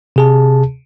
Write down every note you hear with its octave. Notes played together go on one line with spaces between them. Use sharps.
C3 G#4 A5